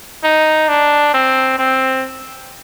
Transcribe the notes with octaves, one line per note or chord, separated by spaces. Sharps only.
D#4
D4
C4
C4